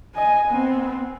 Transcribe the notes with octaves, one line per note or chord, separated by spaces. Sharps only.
D#5 G#5
B3 C4